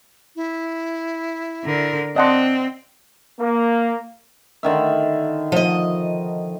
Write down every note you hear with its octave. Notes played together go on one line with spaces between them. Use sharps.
E4
D3 A#4
C4 D5 D#5 F#5 A5 C6 D6
A#3
D3 D#3 E5
F3 D#5